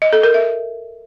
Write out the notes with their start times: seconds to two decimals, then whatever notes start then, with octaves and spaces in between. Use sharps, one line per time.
0.02 D#5
0.13 A4
0.23 A#4
0.34 E5